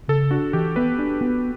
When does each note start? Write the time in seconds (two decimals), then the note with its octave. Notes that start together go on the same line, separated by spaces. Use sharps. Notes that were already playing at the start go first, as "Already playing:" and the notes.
0.08 C#3 A4
0.31 D4 F#4
0.53 E3 G4
0.76 B3 B4
0.99 D4
1.21 B3